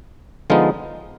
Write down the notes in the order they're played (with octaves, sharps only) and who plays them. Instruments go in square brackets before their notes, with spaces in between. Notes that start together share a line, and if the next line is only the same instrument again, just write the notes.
[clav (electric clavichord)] D3 F3 G#3 B3 D#4 F4